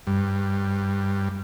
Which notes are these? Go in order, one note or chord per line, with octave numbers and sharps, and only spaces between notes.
G2